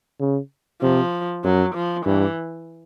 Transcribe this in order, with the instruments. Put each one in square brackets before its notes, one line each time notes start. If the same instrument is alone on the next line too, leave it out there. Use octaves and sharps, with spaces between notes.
[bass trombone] C#3
[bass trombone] C3 [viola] F3
[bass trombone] F#2 [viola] F#3
[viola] F3
[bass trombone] G2 [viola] E3